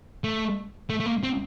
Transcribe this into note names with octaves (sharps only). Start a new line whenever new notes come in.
A3
A3
A3
A#3
C4